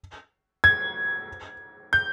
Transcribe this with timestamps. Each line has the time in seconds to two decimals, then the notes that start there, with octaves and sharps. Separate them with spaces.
0.64 G#6
1.93 G6